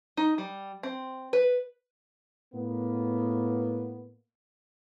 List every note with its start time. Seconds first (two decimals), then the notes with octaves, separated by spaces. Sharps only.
0.17 D#4
0.38 G3
0.83 C4
1.33 B4
2.54 A2 A#3 B3